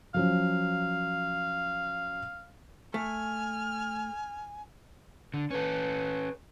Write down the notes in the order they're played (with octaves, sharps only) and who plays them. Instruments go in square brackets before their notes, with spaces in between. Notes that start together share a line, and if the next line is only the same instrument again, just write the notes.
[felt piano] F3 F#3 C#4 [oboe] F5
[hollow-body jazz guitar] A3 [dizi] G#5 [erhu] F6
[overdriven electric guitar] D3
[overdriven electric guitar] C#4 A4 [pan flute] B4